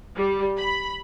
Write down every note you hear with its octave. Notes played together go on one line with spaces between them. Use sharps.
G3
B5